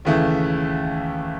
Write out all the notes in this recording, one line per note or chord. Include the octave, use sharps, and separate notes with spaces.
D#2 C#3 E3 A3